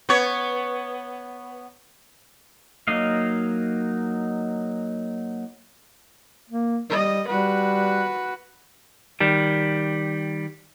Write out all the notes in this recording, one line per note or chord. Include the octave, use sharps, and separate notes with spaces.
B3 C#5
F#3 A#3 D#4 D#5 F5
A#3
G3 D#5
G3 F#4 B4
D#3 G3